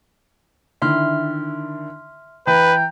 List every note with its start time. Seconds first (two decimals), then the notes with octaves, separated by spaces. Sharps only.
0.82 D3 D#3 E4 E5 C6 F6
2.47 E3 B4 G5 A#5